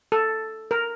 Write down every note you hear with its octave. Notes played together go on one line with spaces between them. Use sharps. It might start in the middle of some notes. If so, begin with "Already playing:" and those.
A4
A#4